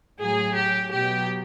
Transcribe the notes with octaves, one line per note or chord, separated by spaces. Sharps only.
A2 F#3 G#4
G4
B2 F#3 G4